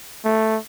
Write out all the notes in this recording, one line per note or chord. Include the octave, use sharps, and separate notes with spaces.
A3